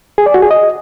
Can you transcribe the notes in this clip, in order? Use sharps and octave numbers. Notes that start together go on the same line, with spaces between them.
G#4
D5
F#4
G#4
D#5